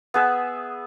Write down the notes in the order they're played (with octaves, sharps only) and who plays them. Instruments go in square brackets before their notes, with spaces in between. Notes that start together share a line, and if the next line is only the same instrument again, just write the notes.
[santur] B3 G#4 E5